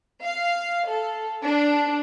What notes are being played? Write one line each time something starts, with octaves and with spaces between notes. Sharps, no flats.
F5
A4
D4